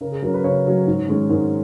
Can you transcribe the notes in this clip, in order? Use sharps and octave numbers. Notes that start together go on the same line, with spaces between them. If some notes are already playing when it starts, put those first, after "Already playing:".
C#3 A#4
G#4
F#3 C#4 A#4
B4
C#3 C#5
F#3 C#4
G#2
D#3 G#3 C#4
G#2 A#4